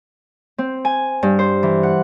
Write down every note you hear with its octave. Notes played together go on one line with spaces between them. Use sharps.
C4
G#5
G2
C5
E3
F#5